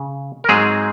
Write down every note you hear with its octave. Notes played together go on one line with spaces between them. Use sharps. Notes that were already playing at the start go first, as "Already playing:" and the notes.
Already playing: C#3
A#4
G#2 F#3 G#3 C4 G#4